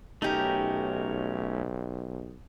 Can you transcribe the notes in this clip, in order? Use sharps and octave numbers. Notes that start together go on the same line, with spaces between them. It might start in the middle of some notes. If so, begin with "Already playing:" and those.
B1 A3 C#4 D#4 G4 A#4